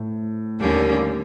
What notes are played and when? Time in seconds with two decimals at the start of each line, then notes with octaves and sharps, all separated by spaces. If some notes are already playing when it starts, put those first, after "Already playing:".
Already playing: A2
0.60 D#2 D3 G3 A#3 C#4